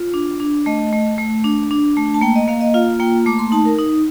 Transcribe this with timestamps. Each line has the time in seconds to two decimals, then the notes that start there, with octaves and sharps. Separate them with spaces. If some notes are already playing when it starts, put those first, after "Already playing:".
Already playing: F4
0.14 D4
0.40 D4
0.66 A3 D#5
0.93 A3
1.18 A3
1.44 D4
1.71 D4
1.97 A3
2.14 A5
2.21 A#3 G5
2.36 D#5
2.48 A#3 F5
2.61 D#5
2.74 F4 F5
3.00 A#3 G5
3.26 A3 D6
3.39 C6
3.52 D#4 A5
3.65 A#4
3.78 D#4